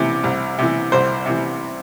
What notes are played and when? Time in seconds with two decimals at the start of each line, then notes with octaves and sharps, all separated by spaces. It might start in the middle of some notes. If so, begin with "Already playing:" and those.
Already playing: C2 C3 E3
0.24 C2
0.59 C3 E3
0.92 C2 C5
1.26 C3 E3